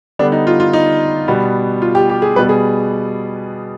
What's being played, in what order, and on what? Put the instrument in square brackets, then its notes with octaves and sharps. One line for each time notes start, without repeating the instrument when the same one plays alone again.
[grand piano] D3 G3 B3 D4
D#4
F4
F4
D#4
B2 G3 B3
F4
G4
G4
G#4
B2 G3 B3 B4
G#4